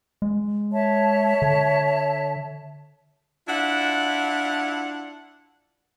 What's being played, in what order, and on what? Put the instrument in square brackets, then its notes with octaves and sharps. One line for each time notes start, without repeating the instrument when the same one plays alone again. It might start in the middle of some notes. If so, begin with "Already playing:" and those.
[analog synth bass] G#3
[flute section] C#5 E5 A5
[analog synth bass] D3
[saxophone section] D4 E4 F4 F#5